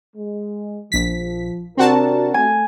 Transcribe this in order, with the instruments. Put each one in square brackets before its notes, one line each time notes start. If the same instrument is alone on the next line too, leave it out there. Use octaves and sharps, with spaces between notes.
[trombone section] G#3
[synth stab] A#1 B6 [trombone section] F3
[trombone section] C3 D4 A#4 [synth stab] C4 F#4 A5
[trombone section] A3 [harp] G#5